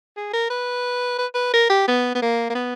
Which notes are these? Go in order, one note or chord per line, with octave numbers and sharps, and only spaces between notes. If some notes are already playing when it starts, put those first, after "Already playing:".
G#4
A#4
B4
B4
B4
A#4
G4
B3
B3
A#3
A#3
B3